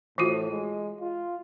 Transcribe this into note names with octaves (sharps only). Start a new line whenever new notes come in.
A2 E3 F4 F#4
G#3
F4